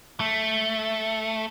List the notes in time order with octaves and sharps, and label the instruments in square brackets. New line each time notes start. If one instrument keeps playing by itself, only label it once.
[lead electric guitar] A3